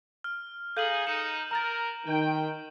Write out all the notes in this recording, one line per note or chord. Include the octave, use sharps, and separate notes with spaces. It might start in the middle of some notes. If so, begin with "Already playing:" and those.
F6
D#4 G#4 A4 F5 G6 D#7 F#7
D#4 C#7 E7
A#4 A#5 A6
D#3 G5